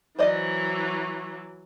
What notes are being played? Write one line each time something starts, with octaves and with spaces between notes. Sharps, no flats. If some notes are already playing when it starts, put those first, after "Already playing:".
E3 F#3 C5 D5 D#5